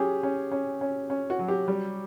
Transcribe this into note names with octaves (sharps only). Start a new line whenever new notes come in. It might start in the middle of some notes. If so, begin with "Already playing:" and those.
Already playing: F#3 C#4 G4 G#4
C#4
C#4
C#4
C#4
F#4
F#3
G4
G3